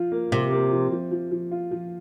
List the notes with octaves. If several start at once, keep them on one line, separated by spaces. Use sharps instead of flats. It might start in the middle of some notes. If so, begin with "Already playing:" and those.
Already playing: F3 F4
A#3
C3 A#3
A#3
F3
F3
F3
F3
F4
F3